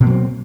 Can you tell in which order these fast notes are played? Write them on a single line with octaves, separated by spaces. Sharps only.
B2 A#3 F#3 C4